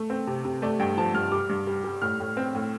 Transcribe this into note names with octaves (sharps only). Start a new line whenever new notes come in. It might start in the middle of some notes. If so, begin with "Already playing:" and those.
Already playing: A3
C4
C3
C3
A3 D5
G2 G5
F3 A5
G2 F6
G3 D6
G2
G3
G3
A2 F6
A2
C4
A2